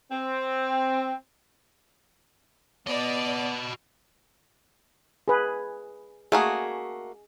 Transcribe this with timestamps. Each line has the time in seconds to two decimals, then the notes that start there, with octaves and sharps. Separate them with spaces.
0.11 C4
2.87 B3 F#4 D5 D#5
5.28 G#4 B4
6.32 A3 A#3 F#4 G#4